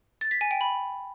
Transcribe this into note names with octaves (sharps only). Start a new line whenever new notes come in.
A6
B6
G#5
G5
B5